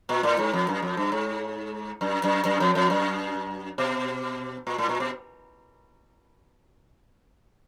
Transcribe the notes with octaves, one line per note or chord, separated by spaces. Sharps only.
A#2
A2
G#2
F2
F#2
F2
G2
G#2
F#2
F#2
F#2
F2
F2
F#2
B2
A#2
A2
A#2
B2